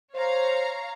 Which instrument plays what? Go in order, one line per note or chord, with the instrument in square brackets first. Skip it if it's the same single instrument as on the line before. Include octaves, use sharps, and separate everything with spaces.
[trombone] C5 [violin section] C#5 F5 A#5